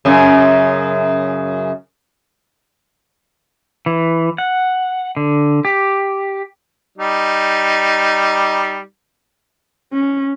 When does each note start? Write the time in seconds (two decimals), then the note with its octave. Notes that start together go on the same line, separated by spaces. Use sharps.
0.05 F#2 C#3
3.86 E3
4.38 F#5
5.17 D3
5.65 G4
6.98 G3 D#4
9.93 C#4